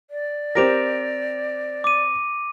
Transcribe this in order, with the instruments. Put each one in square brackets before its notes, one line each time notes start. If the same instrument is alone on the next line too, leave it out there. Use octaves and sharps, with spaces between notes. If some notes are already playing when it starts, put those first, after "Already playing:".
[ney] D5
[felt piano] C4 G4 A#4 [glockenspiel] A#6 D7 F7
[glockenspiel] D6 D#7